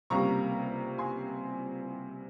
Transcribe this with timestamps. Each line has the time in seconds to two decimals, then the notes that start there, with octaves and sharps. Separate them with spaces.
0.10 C#2 C3 G3 A#3 A#5 C#6
0.98 G#5 C6